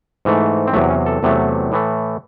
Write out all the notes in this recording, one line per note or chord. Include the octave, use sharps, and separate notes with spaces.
G#2 E3 A3
C4
E2 C3 F#3 A3
C#4
A4
E2 C3 F#3 A3
A2 E3 A3